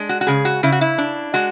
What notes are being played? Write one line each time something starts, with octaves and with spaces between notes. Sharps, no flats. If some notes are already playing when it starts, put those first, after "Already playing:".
Already playing: G#3 D4
F#4
F#4
C#3 G#4
F#4
C#3 E4
F#4
E4
D4
G#3 F#4